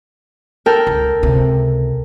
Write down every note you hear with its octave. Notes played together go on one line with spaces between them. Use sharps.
A4 A#4 G5
C#2
C#2 C3